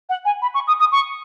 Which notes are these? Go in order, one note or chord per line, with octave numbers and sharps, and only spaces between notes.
F#5
G#5
B5
C#6
D#6
D#6
C#6